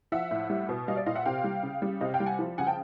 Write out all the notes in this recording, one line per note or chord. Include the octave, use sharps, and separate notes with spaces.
F3 E5 F#5
A2
G3
B2
G3 D#5 F5
D5 E5
A#2 D#5 F5
E5 F#5
C3 F5 G5
G3
C#3
G3
C3 D#5 F5
F5 G5
G3
F#5 G#5
F3
C#3 F#5 G#5
G5 A5